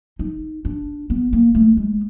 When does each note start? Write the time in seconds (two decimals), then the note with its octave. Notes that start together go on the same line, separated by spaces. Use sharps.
0.19 D#4
0.65 D4
1.10 B3
1.33 A#3
1.55 A3
1.77 G#3